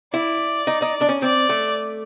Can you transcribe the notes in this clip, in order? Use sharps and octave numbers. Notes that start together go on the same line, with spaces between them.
E4 D5
D#4
D#4
D4
C#4
C4 D5
A3